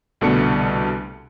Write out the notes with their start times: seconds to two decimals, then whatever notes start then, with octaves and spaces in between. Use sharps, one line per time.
0.21 C2 B2 D3 A3 A4 C#7